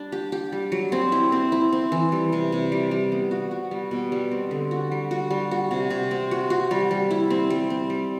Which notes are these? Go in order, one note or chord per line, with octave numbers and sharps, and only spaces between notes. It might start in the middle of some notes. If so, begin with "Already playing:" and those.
Already playing: G3 D4
G4
G4
G3
F#3
C4
E4
C4
E4
C4
E3
G3
C3
C3
G3
G3
B3
F#4
F#4
G3
B2
G3
C4
D3
F#4
G3
F#4
G3
F#4
C3
C3
C4
F#4
F#4
G3
G3
E4
C4
G3
C4
G3